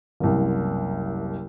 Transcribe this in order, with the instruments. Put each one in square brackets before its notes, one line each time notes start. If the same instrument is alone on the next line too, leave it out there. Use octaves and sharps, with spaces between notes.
[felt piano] F#1 C2